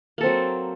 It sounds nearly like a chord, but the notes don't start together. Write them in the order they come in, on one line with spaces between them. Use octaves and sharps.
A#3 A4 C4 F#3